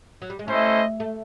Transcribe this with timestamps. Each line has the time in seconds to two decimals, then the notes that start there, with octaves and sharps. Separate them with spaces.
0.22 F#3
0.30 G3
0.39 G#3
0.47 A3 C#4 E4 A4 C5 D#5
1.00 A3